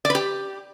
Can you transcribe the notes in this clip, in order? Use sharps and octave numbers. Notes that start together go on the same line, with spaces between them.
D5
B4
G4